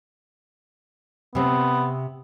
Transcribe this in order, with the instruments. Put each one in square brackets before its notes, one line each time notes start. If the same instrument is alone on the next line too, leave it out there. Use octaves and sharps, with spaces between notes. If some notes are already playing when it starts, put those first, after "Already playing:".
[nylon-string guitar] C3 C4 [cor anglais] B3